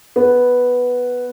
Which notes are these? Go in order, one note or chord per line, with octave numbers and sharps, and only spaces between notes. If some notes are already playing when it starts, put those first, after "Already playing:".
B3